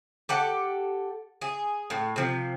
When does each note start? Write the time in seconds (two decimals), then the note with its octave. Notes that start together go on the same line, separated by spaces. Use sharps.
0.29 G4 A4 F#5
1.41 G#4
1.90 A2
2.16 C3 F3